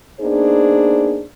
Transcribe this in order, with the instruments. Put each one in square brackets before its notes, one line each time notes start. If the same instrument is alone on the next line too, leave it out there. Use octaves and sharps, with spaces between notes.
[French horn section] A#3 B3 D4 D#4 G#4 C5